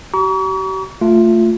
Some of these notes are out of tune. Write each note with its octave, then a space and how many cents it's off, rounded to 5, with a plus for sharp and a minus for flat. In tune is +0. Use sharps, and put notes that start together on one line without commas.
G4 -45 A#5 +25 C#6 +45
A3 +20 F4 +0